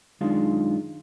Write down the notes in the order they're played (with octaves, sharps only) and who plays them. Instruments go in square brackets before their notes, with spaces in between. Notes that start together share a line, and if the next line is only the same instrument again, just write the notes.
[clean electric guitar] F#2 D#3 G#3 D4 F4